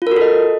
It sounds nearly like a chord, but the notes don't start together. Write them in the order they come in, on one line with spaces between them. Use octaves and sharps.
F4 A#4 F#4 A4 D#5